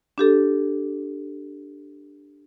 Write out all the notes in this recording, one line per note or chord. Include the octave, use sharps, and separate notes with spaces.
D4 G4 A4